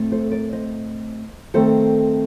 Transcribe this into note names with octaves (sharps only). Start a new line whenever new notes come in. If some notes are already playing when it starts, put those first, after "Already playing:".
Already playing: A2 A3 C4
A4 C5
A#4 D5
C5 D#5
D#3 A3 C4 A4 C5